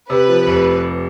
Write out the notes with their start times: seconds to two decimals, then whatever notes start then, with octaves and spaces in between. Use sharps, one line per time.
0.10 C3 B4
0.28 F3
0.47 F1